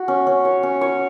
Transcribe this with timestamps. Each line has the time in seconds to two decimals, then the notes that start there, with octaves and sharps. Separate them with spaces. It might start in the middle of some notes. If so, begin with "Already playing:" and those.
Already playing: F#4
0.08 C#4
0.27 C#4
0.45 C#5
0.63 C#4
0.81 C#5